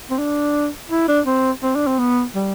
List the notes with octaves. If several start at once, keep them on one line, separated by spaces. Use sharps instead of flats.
C4
D4
E4
D4
C4
C4
D4
C4
B3
G3